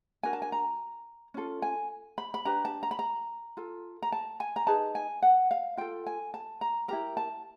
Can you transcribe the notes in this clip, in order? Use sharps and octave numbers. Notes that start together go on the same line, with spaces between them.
D4 F#4 A#4 G#5
A5
G#5
A#5
C#4 F4 A4
G#5
B5
B5
D4 G4 B4 A#5
A5
A#5
B5
A#5
F4 A4
A#5
A5
G#5
A#5
D#4 G#4 B4 A5
G#5
F#5
F5
F4 A4 G5
G#5
A5
A#5
E4 G4 A#4 A#5
A5